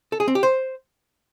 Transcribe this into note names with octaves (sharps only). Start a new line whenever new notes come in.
A4
G#4
C4
G4
C5